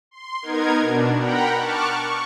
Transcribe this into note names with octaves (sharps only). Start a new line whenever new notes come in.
C6
B3 D#4 A#4 G#6
B2 D4
A#4 F#5 G5 A#5 B5
A5 C#6 D6 F6 F#6
C#6